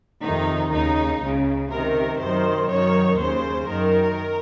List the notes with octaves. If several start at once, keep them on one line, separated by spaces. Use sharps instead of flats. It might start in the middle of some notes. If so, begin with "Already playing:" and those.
F2 C3 D#3 D#4
D#2 C#3 D#4
C#2 C#3
C#2 C3 D#3 A#4
F#2 D#3 C5
F#2 D#3 C#5
D#2 C#3 C5
F#2 D#3 A#4